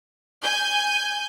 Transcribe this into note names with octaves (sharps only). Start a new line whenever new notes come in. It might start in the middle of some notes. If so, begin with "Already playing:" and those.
G#5 G6